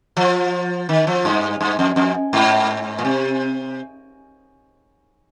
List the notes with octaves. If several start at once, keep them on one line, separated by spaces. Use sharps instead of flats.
F3
D#3
F3
G2
G2
F2
F2
G#2
A#2
C3